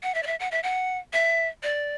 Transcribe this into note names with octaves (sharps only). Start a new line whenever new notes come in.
F#5
E5
D5
E5
F#5
E5
F#5
E5
D5